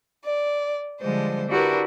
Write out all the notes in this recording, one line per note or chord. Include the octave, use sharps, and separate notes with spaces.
D5
D3 F3 G3 G#3 C5
D4 E4 F#4 G4 A#4 B4